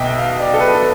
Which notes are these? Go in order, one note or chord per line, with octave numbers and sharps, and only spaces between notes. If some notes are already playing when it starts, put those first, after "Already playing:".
Already playing: B1 B2 E5 G5
F5
D5
A4
B4
A4